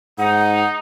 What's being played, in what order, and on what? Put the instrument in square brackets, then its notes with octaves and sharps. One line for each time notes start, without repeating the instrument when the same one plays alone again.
[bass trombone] G#2 [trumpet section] D#4 [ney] F#5